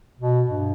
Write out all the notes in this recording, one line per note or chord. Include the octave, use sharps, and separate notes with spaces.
B2
G2